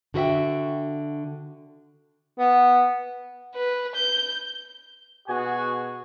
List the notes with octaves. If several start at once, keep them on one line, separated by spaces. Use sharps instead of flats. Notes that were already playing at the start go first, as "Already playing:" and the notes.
D3 F#4 A#4 E5 G5
B3
B4
G6
B2 F#4 G#4 G#5